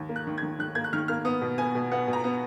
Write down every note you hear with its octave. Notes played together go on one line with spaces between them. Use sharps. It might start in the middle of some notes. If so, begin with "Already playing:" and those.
Already playing: D#2
A#3
F#6
D#3
G#6
D#3
D#3 F#6
A#3 G#6
F#6
D#3 F6
A#3 F6
B3 D#6
B2
B3 G#5
B2
B3 F#5
B2
A#5
B3